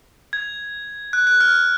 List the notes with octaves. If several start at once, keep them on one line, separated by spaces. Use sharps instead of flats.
G#6
F#6
F#6
F6